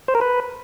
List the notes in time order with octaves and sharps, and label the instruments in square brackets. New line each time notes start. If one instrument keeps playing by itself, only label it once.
[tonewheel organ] C5
A#4
B4